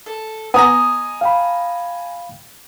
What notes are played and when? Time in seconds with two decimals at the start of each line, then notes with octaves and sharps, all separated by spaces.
0.06 A4
0.54 B3 D#5 G#5 A#5 D#6 A#6
1.21 F5 G5 B5